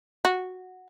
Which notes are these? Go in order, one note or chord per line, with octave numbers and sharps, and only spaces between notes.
F#4